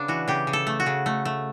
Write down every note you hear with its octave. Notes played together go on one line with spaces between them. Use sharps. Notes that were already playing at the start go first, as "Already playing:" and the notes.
Already playing: C#3 B3 D4
E3 F#4
C#3 G4
C#3
A4
A3
F#4
C#3
A3
A3